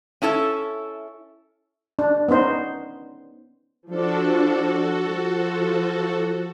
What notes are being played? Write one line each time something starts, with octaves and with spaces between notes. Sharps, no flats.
C#4 E4 A4 E5
D4
B3 C#4 D#4 C5
F3 D4 F#4 A4
F3